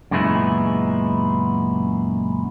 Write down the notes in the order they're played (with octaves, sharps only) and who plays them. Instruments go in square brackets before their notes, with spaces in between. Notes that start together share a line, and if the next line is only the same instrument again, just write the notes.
[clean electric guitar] F#2 A#2 C#3 G#3 B3 E4